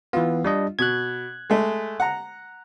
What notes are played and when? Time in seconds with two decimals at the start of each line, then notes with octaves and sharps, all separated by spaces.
0.13 E3 B3 F4
0.44 G3 D4 D#5
0.79 B2 F#6 G#6
1.50 G#3 A3
2.00 F#5 A#5